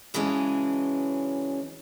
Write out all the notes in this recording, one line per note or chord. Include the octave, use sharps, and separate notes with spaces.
C#3 E3 F#3 G#3 C#4 D4